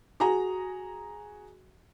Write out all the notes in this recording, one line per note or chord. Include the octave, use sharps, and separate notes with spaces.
F#4 G#4 G#5 A#5